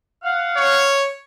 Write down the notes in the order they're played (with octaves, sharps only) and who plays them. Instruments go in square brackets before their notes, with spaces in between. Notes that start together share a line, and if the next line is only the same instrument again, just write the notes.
[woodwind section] F5 F#5
[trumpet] C#5